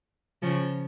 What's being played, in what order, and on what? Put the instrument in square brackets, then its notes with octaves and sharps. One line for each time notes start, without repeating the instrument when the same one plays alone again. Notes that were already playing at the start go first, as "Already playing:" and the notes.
[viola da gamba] C#3 F3